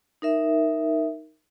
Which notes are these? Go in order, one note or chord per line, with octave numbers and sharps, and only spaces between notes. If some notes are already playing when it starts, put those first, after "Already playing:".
D#4 A#4 E5